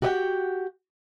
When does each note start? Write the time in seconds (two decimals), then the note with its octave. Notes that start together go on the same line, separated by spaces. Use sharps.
0.02 F#4 G4 A#4 D#5 F#5 G5